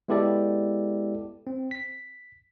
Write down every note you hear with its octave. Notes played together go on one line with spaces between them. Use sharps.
G#3 B3 E4 G4 A4 D5
C4
B6